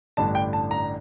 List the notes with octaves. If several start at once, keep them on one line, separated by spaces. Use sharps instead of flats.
A1 G2 D3 G3 D4 A5
G5
A5
A#5